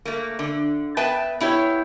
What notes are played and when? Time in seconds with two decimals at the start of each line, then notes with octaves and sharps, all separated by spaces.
0.05 A3 A#3
0.39 D3
0.97 B3 B4 E5 G5 A5
1.40 B3 E4 G4 C#5